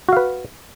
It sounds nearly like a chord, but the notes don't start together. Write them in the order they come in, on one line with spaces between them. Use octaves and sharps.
F#4 F5 B4